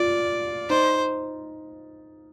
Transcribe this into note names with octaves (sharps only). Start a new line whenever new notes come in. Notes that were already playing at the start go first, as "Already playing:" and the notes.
Already playing: F4 D5
D#4 C5